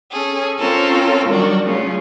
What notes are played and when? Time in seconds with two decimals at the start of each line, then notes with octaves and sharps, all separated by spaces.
0.12 C#4 G#4 A4
0.59 C4 C#4 F4 A4 A#4
1.29 D#3 F#3 G3 D4 F#4
1.63 C#3 F#3 A3 C#4 F4